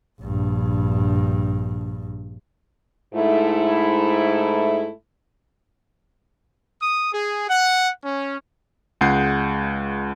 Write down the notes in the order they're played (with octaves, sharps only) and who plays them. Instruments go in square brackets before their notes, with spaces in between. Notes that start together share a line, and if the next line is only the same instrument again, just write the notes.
[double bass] A#1 G2
[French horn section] G#2 A3 E4
[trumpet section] D#6
G#4
F#5
C#4
[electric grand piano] C#2 G#3 F#5 G6 C7